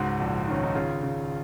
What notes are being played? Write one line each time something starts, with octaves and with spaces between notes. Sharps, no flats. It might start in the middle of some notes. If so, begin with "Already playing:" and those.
Already playing: C#2 G#2 F#4
A#1
D#3 C#4
D#4
C#3 F4
C#3